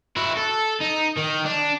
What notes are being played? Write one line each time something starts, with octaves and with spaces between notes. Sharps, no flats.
E4 F#4
A4
D#4
D#3
D4